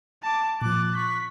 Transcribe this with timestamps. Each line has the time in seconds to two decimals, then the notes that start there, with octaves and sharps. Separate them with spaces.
0.23 A5 D6
0.62 A#2 F3 D6 F#6 A6
0.95 C#6 F#6 B6